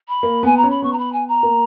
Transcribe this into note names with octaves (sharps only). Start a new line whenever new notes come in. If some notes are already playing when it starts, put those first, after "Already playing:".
B5
A#3
B3 G#5
A#5
C#4
B5
B3 C#6
A#5
B5
G#5
A#5
A#3